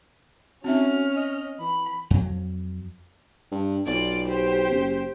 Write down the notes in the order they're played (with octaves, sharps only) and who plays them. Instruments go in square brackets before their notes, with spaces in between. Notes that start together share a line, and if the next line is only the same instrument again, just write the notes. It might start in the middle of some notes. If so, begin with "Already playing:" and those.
[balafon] C4 D#4 E5 [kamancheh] C#4 F6 [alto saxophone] F#4
[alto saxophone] D#5
[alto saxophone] E3 [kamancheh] B5
[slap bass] F2 F#3
[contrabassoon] G2
[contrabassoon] B1 [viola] F4 D5
[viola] G4 C5
[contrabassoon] F#1